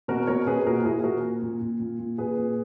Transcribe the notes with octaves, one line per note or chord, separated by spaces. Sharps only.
B2 F#4 A#4
B2 A#4 C#5
B2 G#4 B4
A#2 F#4 A#4
A#2 E4 G#4
A#2 F#4 A#4
A#2
A#2
A#2
A#2
A#2
A#2 G#4 B4
A#2